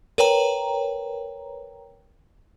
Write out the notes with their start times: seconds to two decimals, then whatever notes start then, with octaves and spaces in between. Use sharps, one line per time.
0.18 A#4 B4 C#5 G5 A#5